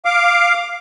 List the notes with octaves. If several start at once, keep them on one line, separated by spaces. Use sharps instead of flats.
F5 D6